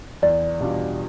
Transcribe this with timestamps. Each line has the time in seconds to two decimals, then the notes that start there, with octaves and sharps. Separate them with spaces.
0.22 E2 D5
0.60 B2 G3 D4 F4